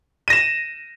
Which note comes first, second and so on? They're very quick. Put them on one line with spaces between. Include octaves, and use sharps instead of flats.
D#7 A#6 E7